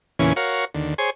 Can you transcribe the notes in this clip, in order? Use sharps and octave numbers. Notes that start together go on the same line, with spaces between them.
E2 A#2 C#3 E3 C#4 G#5
F#4 A#4 C#5 F5
D#2 D3
G#4 C5 C#5 G#5